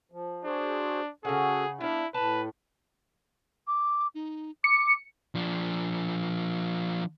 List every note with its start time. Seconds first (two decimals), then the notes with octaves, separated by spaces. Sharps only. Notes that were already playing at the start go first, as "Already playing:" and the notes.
0.12 F3
0.45 D4 F#4 G#4 C5
1.25 C#3 C#4 F#4 G#4 A4 F#5
1.81 B3 D4 E4 F5
2.14 A2 B4 A5
3.67 D6
4.15 D#4
4.64 D6 C#7
5.35 F3 D4